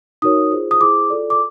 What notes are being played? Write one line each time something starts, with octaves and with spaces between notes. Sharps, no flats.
D#4 F#4 A#4 C#5 D#6
F4 G#4 C5
D#6
E4 G#4 C5 D6
F4 A4 D5
D6